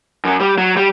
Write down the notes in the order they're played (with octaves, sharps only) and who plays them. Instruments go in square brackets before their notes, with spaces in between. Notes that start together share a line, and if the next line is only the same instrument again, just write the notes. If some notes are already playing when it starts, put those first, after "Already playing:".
[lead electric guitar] F#2 F#3
G3
F#3
G3